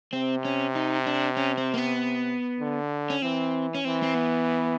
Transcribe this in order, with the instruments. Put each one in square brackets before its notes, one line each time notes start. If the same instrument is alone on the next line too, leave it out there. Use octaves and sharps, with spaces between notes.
[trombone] C3 [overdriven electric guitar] C4
[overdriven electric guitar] C#4
D#4
D4
C#4
C4
A#3
B3
[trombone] D3
[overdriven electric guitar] C#4
[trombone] E3 [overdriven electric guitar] C4
[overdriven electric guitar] C#4
[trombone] E3 [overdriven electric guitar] C4
[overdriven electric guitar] C4
B3